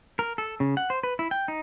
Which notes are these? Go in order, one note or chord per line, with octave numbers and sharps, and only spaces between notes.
A#4
A4
C#3
F#5
C5
B4
E4
G5
D#4